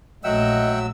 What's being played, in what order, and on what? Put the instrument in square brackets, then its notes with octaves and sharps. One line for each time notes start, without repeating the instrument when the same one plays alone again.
[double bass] A#1 A3 [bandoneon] F#3 E6 [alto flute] D#5 [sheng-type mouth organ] E5 F#5 G5